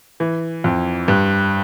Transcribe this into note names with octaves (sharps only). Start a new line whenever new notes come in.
E3
F2
G2